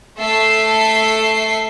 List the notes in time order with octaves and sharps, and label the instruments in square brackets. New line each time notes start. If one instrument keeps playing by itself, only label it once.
[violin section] A3 A4 E5 C7